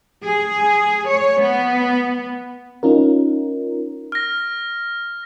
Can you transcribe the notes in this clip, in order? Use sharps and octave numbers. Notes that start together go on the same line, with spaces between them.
G#4
C#5
B3
C#4 D#4 F4 A#4
F6 A#6